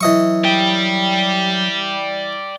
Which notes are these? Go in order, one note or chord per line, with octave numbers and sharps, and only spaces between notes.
E3 F#3 D#5 C#6
D5 G5